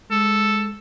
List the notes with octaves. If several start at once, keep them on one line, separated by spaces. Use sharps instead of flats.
G#3 A4